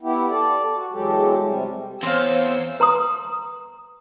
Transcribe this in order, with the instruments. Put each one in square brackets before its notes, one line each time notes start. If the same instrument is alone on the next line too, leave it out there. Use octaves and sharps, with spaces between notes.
[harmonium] B3 E4 G4
A4 D5
F#4
E2 F#3 G#3 G4 A4
C3 G3
[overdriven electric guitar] E2 [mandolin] C4 F5 [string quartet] C5 C#5 E6
[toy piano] B4 A#5 C6 D#6